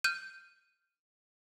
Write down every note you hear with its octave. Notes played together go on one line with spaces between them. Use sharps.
F6 G6 D#7